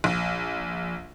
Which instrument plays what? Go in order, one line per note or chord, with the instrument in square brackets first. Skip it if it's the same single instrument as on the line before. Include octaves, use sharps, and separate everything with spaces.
[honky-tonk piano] A#1